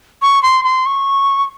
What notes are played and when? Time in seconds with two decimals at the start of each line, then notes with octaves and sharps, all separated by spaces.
0.22 C#6
0.43 C6
0.64 C6
0.86 C#6